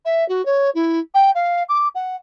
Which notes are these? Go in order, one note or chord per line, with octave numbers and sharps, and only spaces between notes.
E5
F#4
C#5
E4
G5
F5
D6
F#5